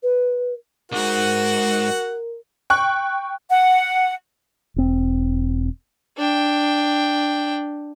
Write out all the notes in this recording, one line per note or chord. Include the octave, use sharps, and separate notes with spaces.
B4
C2 G#2 F#4 A#4 F#5
G5 C#6 F#6
F#5
E1 C4
D4 G5